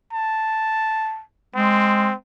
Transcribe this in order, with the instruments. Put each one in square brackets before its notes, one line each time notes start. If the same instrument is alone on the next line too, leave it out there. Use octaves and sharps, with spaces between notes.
[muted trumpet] A5
[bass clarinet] G#3 [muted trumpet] C4